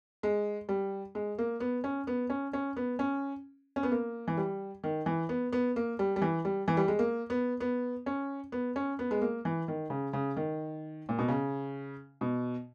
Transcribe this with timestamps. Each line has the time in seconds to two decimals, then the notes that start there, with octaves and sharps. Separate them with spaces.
0.23 G#3
0.69 G3
1.15 G#3
1.38 A#3
1.60 B3
1.84 C#4
2.07 B3
2.30 C#4
2.53 C#4
2.77 B3
2.99 C#4
3.76 C#4
3.83 B3
3.92 A#3
4.28 E3
4.37 G3
4.84 D#3
5.06 E3
5.29 B3
5.53 B3
5.76 A#3
5.99 G3
6.16 G3
6.22 E3
6.45 G3
6.68 E3
6.77 G3
6.88 G#3
6.99 A#3
7.30 B3
7.60 B3
8.06 C#4
8.52 B3
8.76 C#4
8.99 B3
9.11 G#3
9.22 A#3
9.45 E3
9.68 D#3
9.90 C#3
10.13 C#3
10.36 D#3
11.09 A#2
11.19 B2
11.28 C#3
12.21 B2